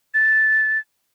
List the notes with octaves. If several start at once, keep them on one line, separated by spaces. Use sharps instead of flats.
A6